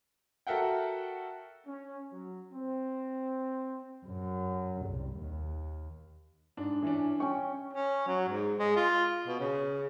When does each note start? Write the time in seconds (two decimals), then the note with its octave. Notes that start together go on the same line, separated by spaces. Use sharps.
0.47 F#4 A4 A#4 E5 F#5 G5
1.67 C#4
2.12 F#3
2.52 C4
4.06 F#2
4.86 C2
5.18 D#2
6.57 G#2 D4
6.83 E3 C#4 D4
7.20 C#4 G5 C#6
7.73 C#4
8.08 F#3
8.29 G#2
8.59 G#3
8.76 F4
9.28 B2
9.40 C#3